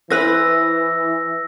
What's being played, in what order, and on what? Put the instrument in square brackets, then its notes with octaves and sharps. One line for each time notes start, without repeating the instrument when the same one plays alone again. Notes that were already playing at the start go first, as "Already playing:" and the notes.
[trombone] E3 [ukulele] E4 B4 C5 [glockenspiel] E6 A#6